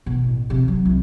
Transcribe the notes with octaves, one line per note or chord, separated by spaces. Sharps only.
B2
A1
C3 F3
F#3
C2